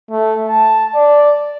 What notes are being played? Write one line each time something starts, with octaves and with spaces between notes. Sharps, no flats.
A3
A5
D5